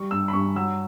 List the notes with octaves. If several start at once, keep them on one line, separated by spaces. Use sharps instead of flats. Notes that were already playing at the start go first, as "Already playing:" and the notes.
Already playing: G3 C#6
G2 E6
B5
G2 C#6
F#3 E6